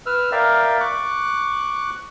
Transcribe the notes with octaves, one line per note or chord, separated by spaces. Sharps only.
B4 E6 F6
A#4 D5 E5 F5 G5
C#6 D6 F#6